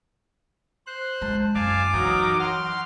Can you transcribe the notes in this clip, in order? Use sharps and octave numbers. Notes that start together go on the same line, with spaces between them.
C5 F#6
G#3 A5
F#1 F5 G#5 A5 D6
E3 F#3 D#4 A#4
F#5 C6 F6